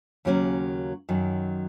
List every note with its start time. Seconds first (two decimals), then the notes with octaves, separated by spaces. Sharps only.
0.25 D#2 C#3 F#3 A#3 C#4
1.09 F#2 D#3 F#3